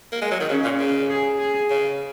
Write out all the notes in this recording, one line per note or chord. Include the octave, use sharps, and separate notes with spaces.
A#3
G#3
F#3
D#3
C#3 C#4
A#2
C#3
G#4
G#4
C#3